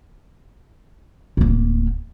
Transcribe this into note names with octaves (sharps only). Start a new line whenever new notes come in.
D1 A#3